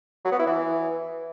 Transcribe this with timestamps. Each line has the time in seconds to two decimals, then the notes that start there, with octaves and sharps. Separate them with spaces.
0.25 F#3
0.32 B3
0.39 E4
0.46 E3